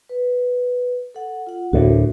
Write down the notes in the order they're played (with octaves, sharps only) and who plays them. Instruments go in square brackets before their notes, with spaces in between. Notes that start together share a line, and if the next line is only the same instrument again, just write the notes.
[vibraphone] B4
A4 F#5
F4 F#5
[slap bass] D2 A2 [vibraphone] F#4 A#4